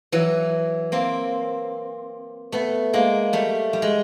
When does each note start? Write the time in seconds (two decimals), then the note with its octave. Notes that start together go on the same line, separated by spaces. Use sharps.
0.12 E3 F#3
0.92 A#3 C4
2.52 A3 B3
2.93 G#3 A#3
3.33 G3 A3
3.73 G3
3.82 G#3